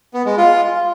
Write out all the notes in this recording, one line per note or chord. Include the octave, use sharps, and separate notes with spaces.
B3
G#3
F4